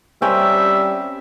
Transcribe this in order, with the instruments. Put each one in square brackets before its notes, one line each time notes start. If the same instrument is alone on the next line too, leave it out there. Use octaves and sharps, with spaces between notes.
[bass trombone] G3 [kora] C4 C#4 A#4 [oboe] E5